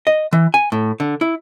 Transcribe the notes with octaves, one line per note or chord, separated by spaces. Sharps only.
D#5
E3
G#5
A2
D3
E4